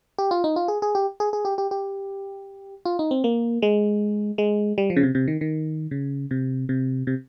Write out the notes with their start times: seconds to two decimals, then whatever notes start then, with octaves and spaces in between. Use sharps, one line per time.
0.18 G4
0.31 F4
0.44 D#4
0.56 F4
0.68 G#4
0.82 G#4
0.95 G4
1.20 G#4
1.33 G#4
1.45 G4
1.58 G4
1.71 G4
2.85 F4
2.99 D#4
3.11 C4
3.24 A#3
3.62 G#3
4.38 G#3
4.78 G3
4.90 F3
4.96 C#3
5.03 C3
5.15 C3
5.28 D#3
5.41 D#3
5.91 C#3
6.31 C3
6.69 C3
7.07 C3